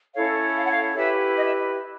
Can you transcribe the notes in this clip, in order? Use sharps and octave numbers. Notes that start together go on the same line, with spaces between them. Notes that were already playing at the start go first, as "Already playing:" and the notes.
C#4 E4 A4 C#5 F5
F5
F#5
F5
E4 G4 B4 E5
D#5
E5